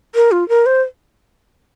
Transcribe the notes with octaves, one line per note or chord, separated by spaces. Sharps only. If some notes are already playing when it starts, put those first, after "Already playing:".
A#4
F4
A#4
C5